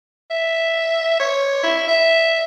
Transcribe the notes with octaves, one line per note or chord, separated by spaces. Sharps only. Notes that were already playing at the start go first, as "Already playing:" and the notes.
E5
C#5
E4
E5